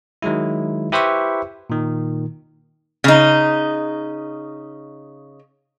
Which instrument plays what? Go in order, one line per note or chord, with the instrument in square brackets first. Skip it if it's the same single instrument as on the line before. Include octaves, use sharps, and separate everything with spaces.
[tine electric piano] D#3 F#3 G#3 E4
E4 G4 B4 C5 E5 C#6
A#2 D#3
[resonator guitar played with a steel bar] C#3 D#4